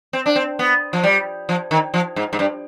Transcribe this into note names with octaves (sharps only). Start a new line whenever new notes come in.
C4
D4
C4
B3
F3
G3
F3
D#3
F3
G#2
G#2
G2